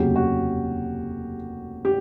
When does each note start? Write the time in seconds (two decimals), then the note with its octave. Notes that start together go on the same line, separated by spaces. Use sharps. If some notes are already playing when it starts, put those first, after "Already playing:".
Already playing: F1 D#2 C#3 F#3 G4
0.15 F#4
1.85 G4